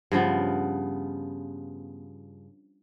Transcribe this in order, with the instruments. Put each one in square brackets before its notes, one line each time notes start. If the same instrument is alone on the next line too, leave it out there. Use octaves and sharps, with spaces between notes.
[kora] G2 C#3 F3 B3